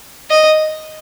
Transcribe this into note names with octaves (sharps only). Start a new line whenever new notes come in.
D#5